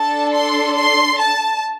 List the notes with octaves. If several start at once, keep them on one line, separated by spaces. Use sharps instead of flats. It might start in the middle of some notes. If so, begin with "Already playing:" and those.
Already playing: D4 A4 A5
C6
C6
A5